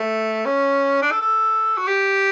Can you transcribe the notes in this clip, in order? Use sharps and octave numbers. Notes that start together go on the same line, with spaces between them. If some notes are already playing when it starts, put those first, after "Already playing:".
Already playing: A3
C#4
D4
A4
A4
F#4
G4